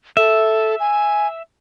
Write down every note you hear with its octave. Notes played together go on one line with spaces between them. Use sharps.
A4 E5
G#5